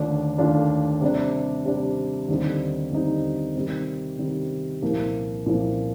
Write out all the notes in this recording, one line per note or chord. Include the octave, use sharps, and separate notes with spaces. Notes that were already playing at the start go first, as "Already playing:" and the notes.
Already playing: D#2 D3 A3 D4 F4
D#2 D3 A3 D4 F4
C3 G3 D4
C3 G3 D4
D#2 D3 G3 C4 D#4
D#2 D3 G3 C4 D#4
C3 D#3 G3
C3 D#3 G3
C2 A#2 F3 A#3
C2 A#2 F3 A#3